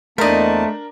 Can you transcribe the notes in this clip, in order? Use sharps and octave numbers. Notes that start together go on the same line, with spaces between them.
E2 A3 A#3 D4 A#4 C5 D#5 A5